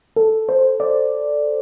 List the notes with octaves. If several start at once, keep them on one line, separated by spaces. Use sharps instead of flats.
A4
C5
D5